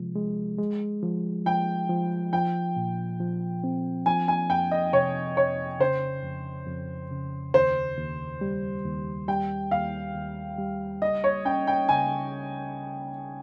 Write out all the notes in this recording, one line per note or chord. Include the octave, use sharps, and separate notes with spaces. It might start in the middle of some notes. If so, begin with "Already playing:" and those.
Already playing: C3 F3 G#3
G#3
G#3
F3
F3 G5
F3
F3 G5
A#2
F3
C4
F3 G#5
G#5
F2 G5
D#5
C3 C#5
F2 C#5
C#3 C5
F2
F2
C#3
D#2 C5
D#2
G3
D#2
G3 G5
D#2 F5
D#2
G3
C#2 D#5
C#5
C#4 G5
G5
C#3 G#5